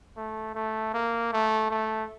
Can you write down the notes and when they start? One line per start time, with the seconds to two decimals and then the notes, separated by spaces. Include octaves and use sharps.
0.17 A3
0.55 A3
0.94 A#3
1.33 A3
1.71 A3